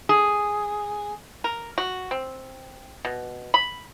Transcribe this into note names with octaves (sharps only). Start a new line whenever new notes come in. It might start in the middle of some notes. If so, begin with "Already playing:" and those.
G#4
A#4
F#4
C4
B2
B5